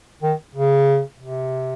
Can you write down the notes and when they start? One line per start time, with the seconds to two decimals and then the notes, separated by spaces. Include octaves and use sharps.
0.23 D#3
0.56 C#3
1.20 C3